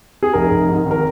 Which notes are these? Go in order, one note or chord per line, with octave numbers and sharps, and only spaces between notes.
G#4
F1 A#4
F1
G#2
G#1
A#4